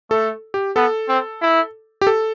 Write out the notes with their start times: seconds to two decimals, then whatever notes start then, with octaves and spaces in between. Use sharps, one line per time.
0.11 A3 A4
0.54 G4
0.76 B3 A4
1.09 C4
1.41 E4
2.01 G4
2.07 A4